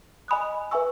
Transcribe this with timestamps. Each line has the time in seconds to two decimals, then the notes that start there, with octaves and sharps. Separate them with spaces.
0.28 D#5 G#5 B5 D#6 F#6
0.71 B4 E5 G#5 C#6 E6